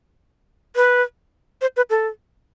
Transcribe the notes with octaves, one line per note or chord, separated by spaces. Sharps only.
B4
C5
B4
A4